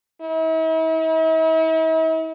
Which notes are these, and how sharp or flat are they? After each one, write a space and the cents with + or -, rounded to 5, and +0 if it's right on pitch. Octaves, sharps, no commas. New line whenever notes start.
E4 -45